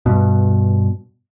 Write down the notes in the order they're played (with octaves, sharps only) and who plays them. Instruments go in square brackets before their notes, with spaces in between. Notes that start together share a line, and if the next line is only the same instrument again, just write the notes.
[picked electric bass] G2 B2